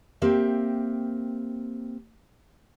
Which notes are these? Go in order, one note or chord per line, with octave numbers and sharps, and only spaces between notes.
A#3 C4 G4 E5